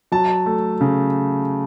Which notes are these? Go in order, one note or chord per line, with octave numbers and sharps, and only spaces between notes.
F#3 A5
A3
C#3